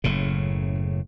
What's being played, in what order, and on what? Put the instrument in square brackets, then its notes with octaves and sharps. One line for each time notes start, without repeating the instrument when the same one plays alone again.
[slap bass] F#1 A2 C#3